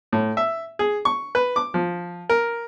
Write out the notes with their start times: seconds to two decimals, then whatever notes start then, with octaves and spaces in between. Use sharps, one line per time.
0.13 A2
0.37 E5
0.79 G#4
1.05 C#6
1.35 B4
1.56 D6
1.74 F3
2.29 A#4